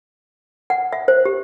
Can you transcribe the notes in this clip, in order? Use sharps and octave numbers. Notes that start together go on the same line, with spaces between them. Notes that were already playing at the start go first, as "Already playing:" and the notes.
F#5
E5
C5
G4